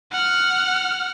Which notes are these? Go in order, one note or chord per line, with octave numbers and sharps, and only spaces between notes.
F#5 F6